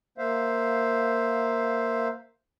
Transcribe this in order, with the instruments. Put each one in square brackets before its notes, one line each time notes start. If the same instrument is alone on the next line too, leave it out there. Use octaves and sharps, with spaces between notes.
[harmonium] A#3 C5 E5 F5